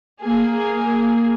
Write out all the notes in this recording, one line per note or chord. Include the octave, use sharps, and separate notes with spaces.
A#3 G#4